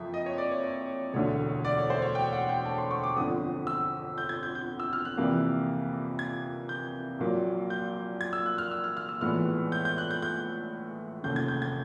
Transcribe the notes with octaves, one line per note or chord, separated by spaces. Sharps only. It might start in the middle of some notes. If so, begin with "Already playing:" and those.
Already playing: F#1 F2 F3 E5
D#5
C#5
D5
C#5
C#5
E1 D2 D3 C#5
D5
C#5
C5
C#5
G5
F#5
G5
A5
C6
C#6
D6
G1 F2 D3 D#6
E6
G6
G#6
G6
G6
E6
F6
F#6
F2 C3 E3 G3 A#3
G#6
G6
A#1 A#2 F#3 A#3
G6
G#6
E6
F#6
F6
E6
F6
F6
E6
A#1 A2 E3 G#3 B3 F6
G6
G6
F#6
G6
G6
F1 D#2 C#3 G6
G#6
G6
G#6